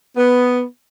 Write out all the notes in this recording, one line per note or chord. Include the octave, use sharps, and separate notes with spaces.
B3